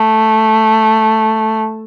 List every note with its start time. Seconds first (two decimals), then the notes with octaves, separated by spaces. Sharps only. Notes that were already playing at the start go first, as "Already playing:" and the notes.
Already playing: A3